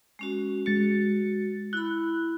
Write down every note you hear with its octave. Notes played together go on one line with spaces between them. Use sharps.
G#3 C#4 F#4
G#3 F#4 A6 C#7
E4 B5 F#6